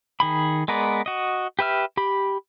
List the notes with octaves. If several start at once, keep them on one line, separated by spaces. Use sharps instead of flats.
D#3 G#4 B5
G#3 B3 A#4 B4 D5
F#4 D#5
G4 B4 E5 F6
G4 B5